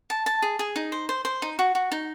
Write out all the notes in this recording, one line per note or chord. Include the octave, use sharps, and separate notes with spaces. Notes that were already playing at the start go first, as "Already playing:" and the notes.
A5
A5
G#4
G#4
D#4
C5
C5
C5
D#4
F#4
F#4
D#4